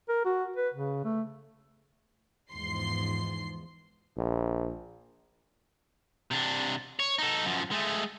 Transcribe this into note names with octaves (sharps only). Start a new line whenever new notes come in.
A#4
F#4
B4
C#3
A3
E2 G#2 F3 C6 C7
A#1
C3 D4
C#5
D#4 A4
F#2 F3
G#3 A3